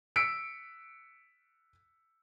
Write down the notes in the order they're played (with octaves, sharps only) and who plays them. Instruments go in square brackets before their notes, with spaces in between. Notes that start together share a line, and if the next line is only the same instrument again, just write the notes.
[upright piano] E6 B6 C#7 D7